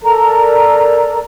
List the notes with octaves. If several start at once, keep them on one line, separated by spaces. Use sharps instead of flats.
A4 A#4 D5 A#5